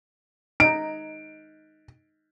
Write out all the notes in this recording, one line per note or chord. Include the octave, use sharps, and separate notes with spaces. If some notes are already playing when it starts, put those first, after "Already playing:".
D#4 D7